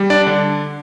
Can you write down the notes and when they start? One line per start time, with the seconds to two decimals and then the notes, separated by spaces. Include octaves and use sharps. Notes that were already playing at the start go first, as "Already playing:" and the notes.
Already playing: G3
0.10 D4 D5
0.27 D3